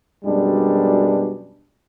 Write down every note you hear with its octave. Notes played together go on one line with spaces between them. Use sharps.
F#2 B2 G3 G#3 D4